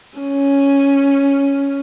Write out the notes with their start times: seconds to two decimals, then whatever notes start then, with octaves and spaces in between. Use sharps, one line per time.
0.19 C#4